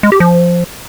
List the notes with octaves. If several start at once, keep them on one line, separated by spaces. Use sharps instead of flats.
G#3
G4
F3